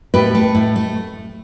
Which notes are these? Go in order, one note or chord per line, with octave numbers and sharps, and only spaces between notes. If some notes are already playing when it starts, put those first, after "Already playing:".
A2 G4 B4
A3
A2
A3